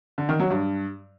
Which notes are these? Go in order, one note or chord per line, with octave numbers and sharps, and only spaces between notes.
D3
D#3
F#3
G2